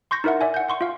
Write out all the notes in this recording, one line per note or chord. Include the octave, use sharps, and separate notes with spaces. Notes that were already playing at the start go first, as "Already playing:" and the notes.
C6 C#6 G6 A#6
D#4 E4 A#4 E5 F#5
D5 E5 G#5
F#5 G6
F#5 C6 C#6
F4 F5